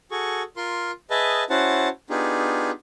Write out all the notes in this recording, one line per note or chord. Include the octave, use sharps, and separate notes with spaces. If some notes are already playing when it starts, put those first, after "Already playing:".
F#4 G#4 A4 C#6
F4 A#4 C6
G#4 B4 D#5 E5 A5
C#4 E4 F#4 C5 F#5 A5
B3 D4 D#4 F4 G4 G#4